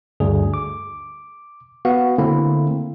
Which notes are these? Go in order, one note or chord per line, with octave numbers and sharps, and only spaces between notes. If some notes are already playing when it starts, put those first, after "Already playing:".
D2 G2 G#4
D6
B3 F#4 F5
D3 A3 A#3 C4 E4